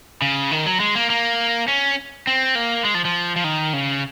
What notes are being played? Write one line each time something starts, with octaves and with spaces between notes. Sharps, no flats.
C#3
D#3
F#3
G#3
A#3
A#3
C#4
C4
A#3
G#3
F3
F3
F3
D#3
C#3